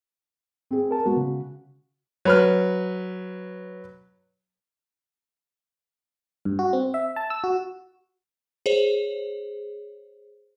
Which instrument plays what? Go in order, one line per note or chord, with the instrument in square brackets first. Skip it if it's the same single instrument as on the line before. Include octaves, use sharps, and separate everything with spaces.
[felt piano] C4 G#4
[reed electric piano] A#4 A5
[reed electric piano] G#3 B3 [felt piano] F#4
[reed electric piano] C#3
[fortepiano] F#3 B4 F6
[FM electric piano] G2
F#4
C4
E5
A5
E6
F#4
[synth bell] G#4 C5 C#5